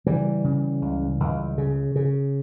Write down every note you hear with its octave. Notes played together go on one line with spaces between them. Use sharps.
C#3 E3 G3
C#3
C#2
C#2
C#3
C#3